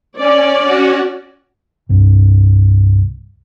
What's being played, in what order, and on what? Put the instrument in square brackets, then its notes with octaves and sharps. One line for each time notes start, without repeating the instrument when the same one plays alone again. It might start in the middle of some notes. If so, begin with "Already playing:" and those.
[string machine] C#4 [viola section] D5
[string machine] C#4 F#4
[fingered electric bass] C2 G2